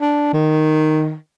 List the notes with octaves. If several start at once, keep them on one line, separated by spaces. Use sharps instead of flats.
D4
D#3